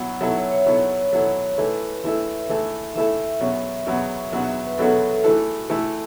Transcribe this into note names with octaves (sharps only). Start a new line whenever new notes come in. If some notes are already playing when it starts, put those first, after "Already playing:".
Already playing: B2 F#3 B3 E4 F#5
B2 F#3 B3 E4 A4 E5
C#5
C#5
B2 F#3 B3 E4 A4
B2 F#3 B3 E4 A4
E3 A3 E4 A4 B4
E3 A3 E4 A4 E5
E3 A3 E4 A4
E3 A3 E4 A4 E5
E2 B2 F#3 C#4 F#4
E2 B2 F#3 C#4 F#4
E2 B2 F#3 C#4 F#4
E5
B4
E2 B2 F#3 C#4 F#4 A4
E3 A3 E4 F#4 A4
E3 A3 E4 A4